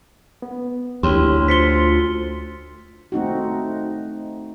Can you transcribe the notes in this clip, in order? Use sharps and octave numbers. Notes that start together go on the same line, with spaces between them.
B3
D2 E4 G4 C#5 C6
F4 C5 B6 C#7 G7
A3 C4 D#4 F#4